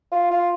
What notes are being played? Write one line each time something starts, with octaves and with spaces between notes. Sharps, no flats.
F4
F4